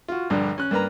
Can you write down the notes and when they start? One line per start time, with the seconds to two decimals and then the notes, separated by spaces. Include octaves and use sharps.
0.08 F4 F#4
0.30 A#1 G2 D3
0.58 C#4 F#6
0.71 G2 A#3 B4 A#5